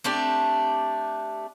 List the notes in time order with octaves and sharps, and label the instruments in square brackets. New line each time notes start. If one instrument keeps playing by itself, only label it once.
[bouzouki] A3 C4 D4 G4